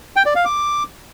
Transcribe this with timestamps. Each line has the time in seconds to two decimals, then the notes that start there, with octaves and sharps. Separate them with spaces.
0.16 G5
0.26 D5
0.36 F5
0.45 D6